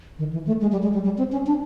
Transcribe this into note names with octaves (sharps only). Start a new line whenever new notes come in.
D#3
E3
A3
G#3
G3
G#3
G3
G3
C4
C#4
D4